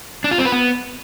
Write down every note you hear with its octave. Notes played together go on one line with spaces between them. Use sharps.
D4
F4
C4
B4
B3